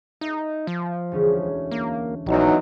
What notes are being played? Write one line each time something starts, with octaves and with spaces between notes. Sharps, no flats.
D#4 E5
F3
E1 D2 C#4
A#3
A#1 E2 F#3 D#4